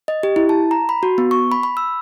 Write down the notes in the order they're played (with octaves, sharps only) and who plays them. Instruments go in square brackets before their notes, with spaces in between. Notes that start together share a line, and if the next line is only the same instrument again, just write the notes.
[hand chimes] D#5
G4
E4
A5
A#5
B5
F#4
B3
C#6
B5
B5
E6